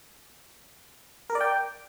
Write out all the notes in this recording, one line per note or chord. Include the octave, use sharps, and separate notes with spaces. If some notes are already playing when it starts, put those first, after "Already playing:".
A#4
D5
G5